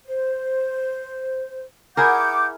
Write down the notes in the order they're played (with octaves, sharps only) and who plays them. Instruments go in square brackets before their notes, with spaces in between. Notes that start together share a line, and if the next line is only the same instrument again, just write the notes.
[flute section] C5
[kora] E4 G#4 A#4 [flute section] F#5 D6 G6